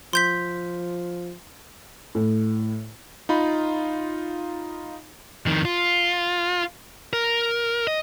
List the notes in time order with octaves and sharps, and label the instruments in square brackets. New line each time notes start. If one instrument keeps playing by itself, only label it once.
[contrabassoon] F3 [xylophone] C6 G6 B6
[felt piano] A2
[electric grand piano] D#4 F4 B5
[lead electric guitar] F2 D#3
F4
A#4
D#5